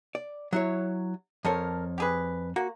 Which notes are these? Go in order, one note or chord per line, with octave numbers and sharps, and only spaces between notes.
D5
F#3 E4 C#5
F2 A4 A#4 C#5
G4 G#4 B4
A#3 F#4